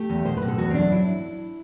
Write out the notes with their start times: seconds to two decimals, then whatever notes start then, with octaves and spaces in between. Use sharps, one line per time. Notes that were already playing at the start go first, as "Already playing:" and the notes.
Already playing: A3 G4
0.10 E2
0.25 B2 C5
0.37 B2 B4
0.48 A4
0.58 E2 F#4
0.70 C4
0.74 F#3 D4
0.92 E4